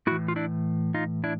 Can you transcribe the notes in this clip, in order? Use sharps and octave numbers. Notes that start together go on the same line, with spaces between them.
A2 E3 E4 F#4
F4
D4 E4
D#4 F4
D4 E4